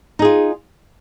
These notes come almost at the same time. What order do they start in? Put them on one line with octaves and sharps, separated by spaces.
D#4 G#4 F4